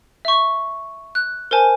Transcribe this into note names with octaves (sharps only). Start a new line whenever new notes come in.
E5 C#6
F#6
A#4 C5 G#5 A5